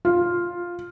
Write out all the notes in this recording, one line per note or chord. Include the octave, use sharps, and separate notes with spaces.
F4